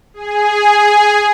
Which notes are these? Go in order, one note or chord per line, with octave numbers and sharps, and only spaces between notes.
G#4